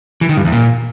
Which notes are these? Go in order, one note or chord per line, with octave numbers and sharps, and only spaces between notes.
E3
D#3
G2
E2
A#2